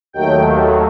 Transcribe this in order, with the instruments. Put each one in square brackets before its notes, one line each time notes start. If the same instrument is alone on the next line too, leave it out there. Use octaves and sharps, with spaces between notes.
[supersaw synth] D#2 D#3 F#3 A3 G5